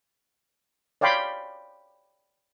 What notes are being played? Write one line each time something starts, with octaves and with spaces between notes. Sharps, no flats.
C#5 D5 F5 G5 B5 C6